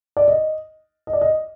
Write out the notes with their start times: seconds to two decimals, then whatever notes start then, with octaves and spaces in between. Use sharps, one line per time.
0.17 D5
0.28 D#5
1.07 D#5
1.13 D5
1.21 D#5